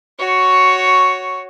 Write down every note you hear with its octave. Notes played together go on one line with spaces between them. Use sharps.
F#4 C#5